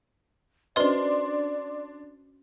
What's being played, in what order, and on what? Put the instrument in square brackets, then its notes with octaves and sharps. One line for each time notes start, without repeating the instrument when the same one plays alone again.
[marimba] C#4 F#4 C5 [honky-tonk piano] D4 C6 [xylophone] B4 D#5 [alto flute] D5